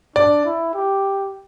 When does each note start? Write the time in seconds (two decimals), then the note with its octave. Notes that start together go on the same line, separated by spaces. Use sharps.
0.16 D4 D5
0.45 E4
0.74 G4